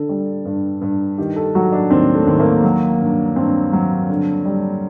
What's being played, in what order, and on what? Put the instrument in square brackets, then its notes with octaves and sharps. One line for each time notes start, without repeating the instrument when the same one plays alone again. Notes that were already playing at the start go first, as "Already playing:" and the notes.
Already playing: [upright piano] D3 A4
G3
G2
G2
D#3 G4
A4
F#3 F#4
D4
D#2 C4
A3
D#2 C4
A#3
F#3
G2
G2 C4
F#3
D3
G3